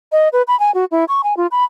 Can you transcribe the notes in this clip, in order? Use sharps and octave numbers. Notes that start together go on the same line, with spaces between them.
D#5
B4
B5
G#5
F#4
E4
C#6
G#5
F4
B5